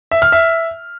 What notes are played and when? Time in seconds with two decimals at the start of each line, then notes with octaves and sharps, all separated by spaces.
0.11 E5
0.22 F6
0.32 E5